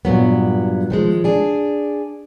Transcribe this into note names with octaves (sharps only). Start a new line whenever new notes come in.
G2 A#2 F#3 B3
D#3 F3 G#3
D4 G#4